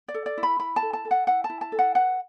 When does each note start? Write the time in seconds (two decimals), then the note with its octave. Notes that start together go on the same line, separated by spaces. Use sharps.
0.08 D5
0.14 A4
0.26 D5
0.38 E4
0.43 B5
0.60 E4 B5
0.76 A5
0.82 A4
0.93 A5
1.05 A4
1.11 F#5
1.27 E4 F#5
1.44 A5
1.50 E4
1.61 A5
1.72 A4
1.79 F#5
1.95 B4 F#5